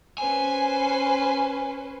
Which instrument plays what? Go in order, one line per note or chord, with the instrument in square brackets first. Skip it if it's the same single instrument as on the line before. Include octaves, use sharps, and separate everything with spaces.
[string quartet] C#4 B4 C5 [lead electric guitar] G#5